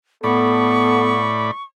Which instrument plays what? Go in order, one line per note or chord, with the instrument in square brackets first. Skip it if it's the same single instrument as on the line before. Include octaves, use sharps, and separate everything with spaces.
[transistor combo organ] A2 D5 B5 [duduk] B3 [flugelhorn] A4 [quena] C#6